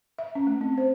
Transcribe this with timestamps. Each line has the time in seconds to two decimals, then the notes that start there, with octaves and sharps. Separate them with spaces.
0.19 E5
0.35 C#4
0.47 A3
0.61 C4
0.78 C5